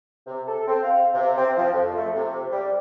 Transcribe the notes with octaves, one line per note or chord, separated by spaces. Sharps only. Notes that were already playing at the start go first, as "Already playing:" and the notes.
C3
A4
C4
F5
C3
C4
F3
F2
A3
C3
G3